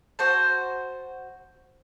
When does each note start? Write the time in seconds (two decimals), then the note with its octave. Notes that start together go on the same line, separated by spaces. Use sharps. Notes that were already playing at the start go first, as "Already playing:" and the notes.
0.19 F#4 C5 A5